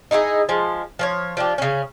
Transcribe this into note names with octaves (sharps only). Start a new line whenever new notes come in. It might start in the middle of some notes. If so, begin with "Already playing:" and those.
D#4 E4 F#4 G#4
F3 G#3
F3 C5 C#5
F3 D4 G4
C#3 C#4